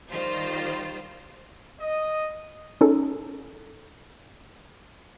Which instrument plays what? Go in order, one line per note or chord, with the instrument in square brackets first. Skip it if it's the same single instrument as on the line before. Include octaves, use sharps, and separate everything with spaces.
[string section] D#3 G3 F4 C5
[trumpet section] D#5
[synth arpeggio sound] C#4 D#4 G#4 A4